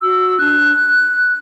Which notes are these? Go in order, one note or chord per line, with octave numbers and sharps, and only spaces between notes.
F#4 E6
D4 F#6